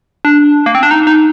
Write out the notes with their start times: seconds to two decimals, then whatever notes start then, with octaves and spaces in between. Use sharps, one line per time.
0.25 D4
0.66 A#3
0.75 C4
0.83 D4
0.91 D#4
1.07 D#4